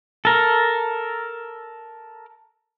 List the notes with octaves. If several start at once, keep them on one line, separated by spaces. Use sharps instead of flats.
A4 A#4